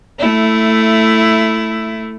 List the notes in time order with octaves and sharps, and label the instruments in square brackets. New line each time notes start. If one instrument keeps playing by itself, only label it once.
[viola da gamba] A3 E4